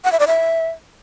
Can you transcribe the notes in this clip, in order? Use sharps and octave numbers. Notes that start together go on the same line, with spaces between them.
F#5
E5
D5
E5